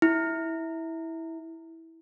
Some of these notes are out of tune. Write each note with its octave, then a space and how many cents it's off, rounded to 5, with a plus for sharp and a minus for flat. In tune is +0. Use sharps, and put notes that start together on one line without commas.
E4 -15